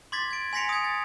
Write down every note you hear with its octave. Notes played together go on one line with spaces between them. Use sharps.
C6 D6 G#6 A6 B6
G#6 D7
G#5 C6 A#6 B6 C#7 F7
D#6 G#6
A6